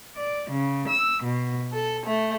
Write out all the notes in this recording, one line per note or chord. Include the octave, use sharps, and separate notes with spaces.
D5
C#3
E6
B2
A4
A3